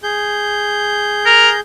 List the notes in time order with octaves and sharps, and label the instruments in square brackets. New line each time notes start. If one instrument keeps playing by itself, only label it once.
[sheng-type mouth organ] G#4 G6
[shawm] A#4